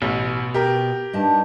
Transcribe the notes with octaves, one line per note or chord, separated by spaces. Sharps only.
A1 B2
G4 A#4
G2 D#4 A5